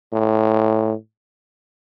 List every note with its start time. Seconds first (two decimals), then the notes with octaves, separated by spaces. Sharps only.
0.13 A2